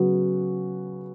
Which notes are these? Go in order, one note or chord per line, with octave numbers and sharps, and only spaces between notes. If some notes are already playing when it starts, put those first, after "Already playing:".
Already playing: C#3 F#3 B3 F#4